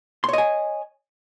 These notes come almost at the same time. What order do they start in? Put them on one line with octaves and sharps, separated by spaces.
C6 C#5 D#5 G#5